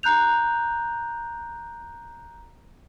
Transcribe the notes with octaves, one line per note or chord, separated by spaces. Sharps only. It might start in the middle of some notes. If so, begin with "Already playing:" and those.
A#5 F#6 G6 F7